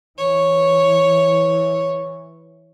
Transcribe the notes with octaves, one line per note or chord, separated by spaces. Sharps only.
E3 C#5